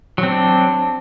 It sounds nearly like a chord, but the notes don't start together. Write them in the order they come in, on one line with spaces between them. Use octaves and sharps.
F#3 C4 D4